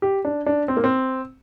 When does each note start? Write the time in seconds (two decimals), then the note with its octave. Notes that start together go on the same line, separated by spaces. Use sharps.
0.02 G4
0.25 D4
0.46 D4
0.68 C4
0.77 A#3
0.84 C4